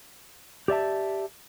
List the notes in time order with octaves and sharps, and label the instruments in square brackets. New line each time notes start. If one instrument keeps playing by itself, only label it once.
[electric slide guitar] G4 D5 E5 A5